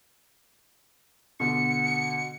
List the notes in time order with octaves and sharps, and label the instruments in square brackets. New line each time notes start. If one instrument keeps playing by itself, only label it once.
[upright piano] B2 D3 [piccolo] C#7